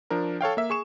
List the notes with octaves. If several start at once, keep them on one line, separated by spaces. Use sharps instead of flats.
F3 D4 A#4
A4 C#5 F5 G5
A#3 E5
G#4 C#6 E7